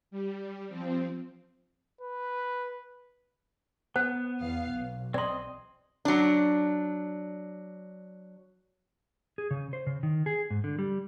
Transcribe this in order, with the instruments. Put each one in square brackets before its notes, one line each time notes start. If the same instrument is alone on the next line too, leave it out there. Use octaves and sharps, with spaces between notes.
[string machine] G3
F3 C4
[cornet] B4
[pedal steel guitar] B3 [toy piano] C5 F#5
[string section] E2 F5
B1
[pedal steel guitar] C4 D#5 [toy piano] D5 C6
[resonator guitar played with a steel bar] F#3 D4
[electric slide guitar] G#4
C#3
C5
C#3
D#3
G#4
G#2
D3
G3